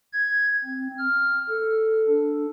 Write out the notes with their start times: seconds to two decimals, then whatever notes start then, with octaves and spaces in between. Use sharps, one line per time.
0.13 G#6
0.64 C4
0.99 F6
1.49 A4
2.08 D4